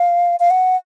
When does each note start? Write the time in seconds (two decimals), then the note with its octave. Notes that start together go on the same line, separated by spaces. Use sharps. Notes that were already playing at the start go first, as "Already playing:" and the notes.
Already playing: F5
0.40 F5
0.50 F#5